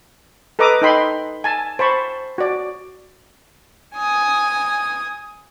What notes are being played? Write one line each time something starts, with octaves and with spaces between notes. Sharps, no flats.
A4 B4 D#5 A#5 D6 D#6
D#4 A4 D#5 G5 B5 C6
G#5 A5
C5 A5 B5 C#6
F#4 D5
G#5 D#6